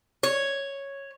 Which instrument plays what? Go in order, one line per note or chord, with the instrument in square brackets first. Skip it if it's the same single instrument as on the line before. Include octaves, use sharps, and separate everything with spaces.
[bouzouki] C#5